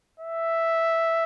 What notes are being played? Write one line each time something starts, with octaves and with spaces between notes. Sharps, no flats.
E5